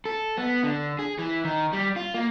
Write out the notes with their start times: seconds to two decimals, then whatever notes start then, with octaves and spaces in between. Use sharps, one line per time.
0.05 A4
0.38 B3
0.63 D3
0.99 G#4
1.19 E3
1.44 D#3
1.73 G3
1.96 F4
2.14 A#3